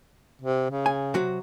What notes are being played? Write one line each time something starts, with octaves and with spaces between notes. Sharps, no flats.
C3
C#3
G#5
C3 F#3 F#4